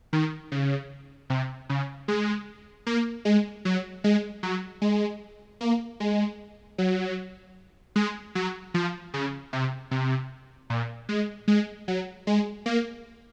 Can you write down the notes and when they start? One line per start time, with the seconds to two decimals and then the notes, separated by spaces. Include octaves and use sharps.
0.13 D#3
0.52 C#3
1.30 C3
1.69 C#3
2.08 G#3
2.87 A#3
3.25 G#3
3.65 F#3
4.04 G#3
4.43 F#3
4.82 G#3
5.61 A#3
6.00 G#3
6.78 F#3
7.96 G#3
8.35 F#3
8.74 F3
9.14 C#3
9.53 C3
9.91 C3
10.70 A#2
11.09 G#3
11.48 G#3
11.88 F#3
12.27 G#3
12.66 A#3